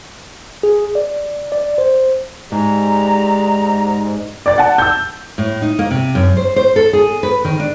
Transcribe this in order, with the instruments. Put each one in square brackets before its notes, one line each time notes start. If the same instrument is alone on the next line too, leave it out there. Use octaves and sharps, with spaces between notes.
[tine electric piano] G#4
D5
D5
C5
[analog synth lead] G#2 [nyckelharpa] G4 D5 [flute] A#5
[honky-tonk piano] D5 A6
F#5 A5
E6 G6
[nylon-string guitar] A2
D#4
A#3
C3
F#2
C5
C5
A4
G#4
B4
D#3
D4